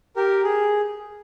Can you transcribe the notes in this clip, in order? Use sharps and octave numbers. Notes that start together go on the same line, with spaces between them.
G4 A#4
G#4